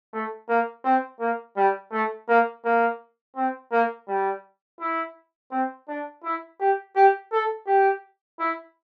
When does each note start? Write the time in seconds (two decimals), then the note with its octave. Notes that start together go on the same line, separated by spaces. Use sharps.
0.13 A3
0.49 A#3
0.85 C4
1.20 A#3
1.57 G3
1.92 A3
2.29 A#3
2.65 A#3
3.36 C4
3.72 A#3
4.08 G3
4.80 E4
5.52 C4
5.88 D4
6.24 E4
6.60 G4
6.96 G4
7.32 A4
7.67 G4
8.39 E4